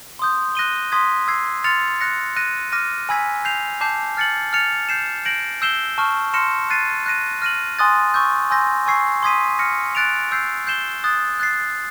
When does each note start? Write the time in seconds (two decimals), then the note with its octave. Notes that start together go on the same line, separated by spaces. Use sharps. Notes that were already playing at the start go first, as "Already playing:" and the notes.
0.19 C6 D#6 G6
0.55 F#6 A#6 D#7 G7
0.92 C6 D#6 G#6 B6
1.28 E6 G#6 C7
1.64 C6 F6 A6 C#7 F7
2.00 F#6 A#6 C#7
2.36 F#6 A#6 D#7
2.72 D6 F6 A#6 D#7
3.09 G#5 B5 E6 G#6 B6
3.45 G6 C7 F7
3.81 A5 D6 G6 C7
4.17 F6 A6 C#7 F#7
4.53 F6 A6 C#7 F7
4.89 G6 C7 E7
5.25 G6 A#6 D7 F#7
5.62 E6 G6 C7 E7 G7
5.98 A5 C#6 F6
6.34 C6 F6 A#6 C#7 E7
6.70 F#6 A6 C7 D#7
7.06 F#6 A#6 D#7
7.42 F6 A#6 D#7 F#7
7.78 G#5 C6 D#6 F#6 A6
8.14 C#6 E6 G6
8.51 G#5 C6 E6 G6 A#6
8.86 G#5 C#6 E6 G#6 C7
9.23 C6 D#6 G#6 B6 D#7
9.59 F6 A#6 C#7
9.95 F#6 A6 D7 F7
10.32 E6 G6 C7
10.67 G6 C7 E7 G7
11.04 D#6 F#6 A6
11.40 F#6 A6 C7